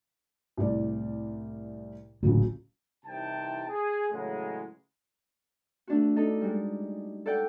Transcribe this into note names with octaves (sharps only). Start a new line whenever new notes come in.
C2 A2 D5
D1 A1 D2 A#2 C#3 F#3
C2 C3 E3 D#4 G5 A5
G#4
A2 C#3 E3 F#3 G#3
A3 D4 F#4
D#4 A4 D#5
G3 G#3
A4 D5 F#5 G5